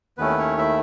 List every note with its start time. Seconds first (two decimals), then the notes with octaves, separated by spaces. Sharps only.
0.18 D#2 D#3 A3 B3 C#4 E4 B4
0.38 C#4 C#5
0.58 E4 E5